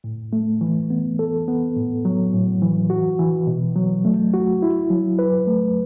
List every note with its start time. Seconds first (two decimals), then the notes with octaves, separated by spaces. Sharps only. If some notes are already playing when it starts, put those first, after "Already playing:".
0.04 A2
0.33 A3
0.61 E3
0.90 B3
1.19 A4
1.48 B3
1.76 A2
2.05 F#3
2.33 A2
2.62 E3
2.90 F#4
3.19 E3
3.47 B2
3.76 F#3
4.05 A3
4.34 F#4
4.62 E4
4.90 F#3
5.19 B4
5.47 A3